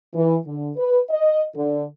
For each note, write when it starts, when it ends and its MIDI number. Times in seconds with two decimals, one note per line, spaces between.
0.14 0.36 52
0.45 0.70 50
0.77 0.99 71
1.10 1.43 75
1.55 1.83 50